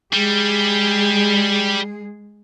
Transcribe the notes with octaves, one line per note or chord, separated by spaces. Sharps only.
G3 G#3 G#4